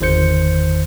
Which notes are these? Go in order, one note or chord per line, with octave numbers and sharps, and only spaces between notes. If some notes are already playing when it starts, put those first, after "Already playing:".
G1 E2 D#3 C5 G6 C#7